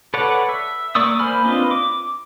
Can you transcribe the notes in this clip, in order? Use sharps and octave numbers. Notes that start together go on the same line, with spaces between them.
A4 B4 C#5 D5 F#5
E5
A#3 D5 C#6 D#6 E6
A#3 C5 G#5 B5 F6
C4 D4 F4 B4 D#5
D6